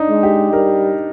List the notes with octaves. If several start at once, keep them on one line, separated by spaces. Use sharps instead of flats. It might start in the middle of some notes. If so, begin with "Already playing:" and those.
Already playing: D4 D#4
G#3
G4
G3 A#4